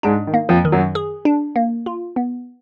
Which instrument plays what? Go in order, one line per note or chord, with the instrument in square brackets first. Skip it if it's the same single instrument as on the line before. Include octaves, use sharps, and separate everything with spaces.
[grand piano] G#2 G#3 [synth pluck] D4
[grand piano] D#3
[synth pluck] A#3
[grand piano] F2 F3
[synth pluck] D#3
[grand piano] F#2 F#3
[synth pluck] G#4
D4
A#3
F4
B3